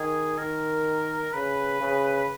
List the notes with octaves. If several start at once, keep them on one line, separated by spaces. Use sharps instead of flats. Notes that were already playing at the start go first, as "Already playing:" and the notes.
Already playing: D#3 G#4
D#3 A#4
C#3 B4
C#3
B4